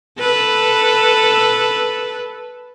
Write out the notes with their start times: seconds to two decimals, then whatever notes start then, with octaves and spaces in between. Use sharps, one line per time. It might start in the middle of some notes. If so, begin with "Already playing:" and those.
0.20 A4 B4